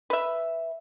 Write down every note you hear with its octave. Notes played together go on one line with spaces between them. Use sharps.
B4 E5